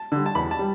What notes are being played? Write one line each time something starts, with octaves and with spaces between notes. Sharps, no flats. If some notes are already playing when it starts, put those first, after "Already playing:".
Already playing: A5
D3 G3
A5
E2 B5
A5
G3